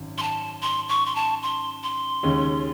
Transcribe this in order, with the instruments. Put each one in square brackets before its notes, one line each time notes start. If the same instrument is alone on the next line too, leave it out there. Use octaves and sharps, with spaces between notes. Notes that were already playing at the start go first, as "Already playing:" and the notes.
Already playing: [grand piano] G#1 F#2
[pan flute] C6
A5
C6
C#6
C6
A5
C6
C6
[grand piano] D#2 C#3 G#3 C#4